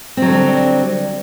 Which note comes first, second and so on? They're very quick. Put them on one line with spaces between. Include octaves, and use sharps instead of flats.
C4 F#3 D3 G3